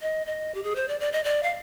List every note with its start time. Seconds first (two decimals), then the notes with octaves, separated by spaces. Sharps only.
0.02 D#5
0.26 D#5
0.54 G4
0.63 G#4
0.75 C5
0.88 D5
1.00 D5
1.12 D#5
1.24 D5
1.43 F5